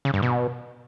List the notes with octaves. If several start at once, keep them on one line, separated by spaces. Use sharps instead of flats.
C#3
G2
B2